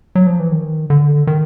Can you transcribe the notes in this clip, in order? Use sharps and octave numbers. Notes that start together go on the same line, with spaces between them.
F#3
F3
E3
D#3
D3
D#3